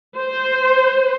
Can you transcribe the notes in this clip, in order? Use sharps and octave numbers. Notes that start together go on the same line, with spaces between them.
C5